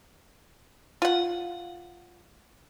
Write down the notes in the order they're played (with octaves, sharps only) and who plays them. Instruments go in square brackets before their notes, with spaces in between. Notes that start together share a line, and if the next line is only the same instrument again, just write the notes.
[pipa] F4 F#5